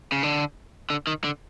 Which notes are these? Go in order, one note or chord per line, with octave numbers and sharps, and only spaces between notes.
C#3
D3
D3
D#3
D3